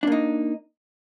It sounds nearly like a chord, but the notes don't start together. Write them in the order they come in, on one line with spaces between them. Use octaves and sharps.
D4 A#3 D#4